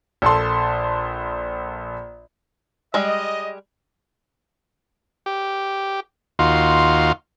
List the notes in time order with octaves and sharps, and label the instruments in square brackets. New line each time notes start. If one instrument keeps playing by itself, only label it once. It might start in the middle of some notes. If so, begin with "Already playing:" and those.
[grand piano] A#1 A4 A5 C6
[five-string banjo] G3 G#3 [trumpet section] D#5
[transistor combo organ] G4
D#2 D#4 F4 F#4 F5 C6